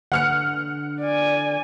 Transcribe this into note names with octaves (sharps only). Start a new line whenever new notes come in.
D3 F#5 F6 C#7
D5 G#5